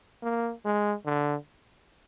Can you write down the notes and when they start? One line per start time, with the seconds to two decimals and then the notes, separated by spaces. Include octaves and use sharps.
0.23 A#3
0.65 G#3
1.06 D3